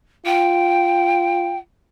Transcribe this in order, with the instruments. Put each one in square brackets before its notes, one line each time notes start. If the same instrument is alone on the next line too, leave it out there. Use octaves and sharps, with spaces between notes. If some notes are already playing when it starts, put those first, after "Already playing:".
[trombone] F4 [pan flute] G5